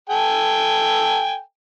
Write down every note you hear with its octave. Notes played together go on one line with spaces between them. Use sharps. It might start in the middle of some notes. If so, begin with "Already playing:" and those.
A4 G5 G#5